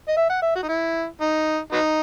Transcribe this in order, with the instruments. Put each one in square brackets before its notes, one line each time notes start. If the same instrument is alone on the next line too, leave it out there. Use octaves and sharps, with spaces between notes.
[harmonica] D#5
E5
F#5
E5
F#4
D#4
E4
D#4
F#3 B3 D#4